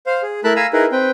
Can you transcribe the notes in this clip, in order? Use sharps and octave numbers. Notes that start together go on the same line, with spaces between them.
C5 F5
G#4
A3 E4 A#4 A5 B5 F#6
F5 G#5 A#5 B5 E6
D#4 E4 G#4 A#4 B4
C4 B4 G5